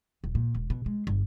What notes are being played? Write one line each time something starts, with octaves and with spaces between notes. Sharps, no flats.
D#1
A#2
E1
B2
G#3
G1